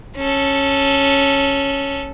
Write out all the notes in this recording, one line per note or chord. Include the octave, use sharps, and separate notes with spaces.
C#4 A4